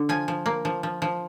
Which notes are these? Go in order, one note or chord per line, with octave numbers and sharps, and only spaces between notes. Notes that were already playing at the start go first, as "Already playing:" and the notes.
Already playing: D3
F3 G#5
F3
A#3
F3
F3
F3